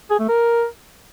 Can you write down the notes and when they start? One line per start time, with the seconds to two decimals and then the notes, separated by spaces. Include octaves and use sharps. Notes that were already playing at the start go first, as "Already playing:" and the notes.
0.11 G#4
0.20 A3
0.29 A#4